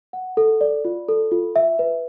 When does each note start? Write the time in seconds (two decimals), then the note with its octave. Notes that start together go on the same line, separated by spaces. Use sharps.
0.13 F#5
0.37 A4
0.61 D5
0.85 F4
1.08 A4
1.32 F4
1.56 E5
1.79 B4